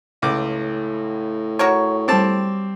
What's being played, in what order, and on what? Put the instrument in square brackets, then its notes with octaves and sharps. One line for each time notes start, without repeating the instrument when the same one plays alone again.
[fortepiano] C#2 D6 [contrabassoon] A2
[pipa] F#4 A#4 C#5
[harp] G3 D6 [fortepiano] C4 A5